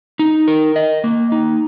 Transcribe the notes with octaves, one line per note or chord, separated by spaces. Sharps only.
D#4
A#4
D#5
A#3
D#4